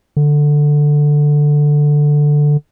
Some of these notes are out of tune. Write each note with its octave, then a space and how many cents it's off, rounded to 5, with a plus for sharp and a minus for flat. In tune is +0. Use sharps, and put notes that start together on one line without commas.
D3 +5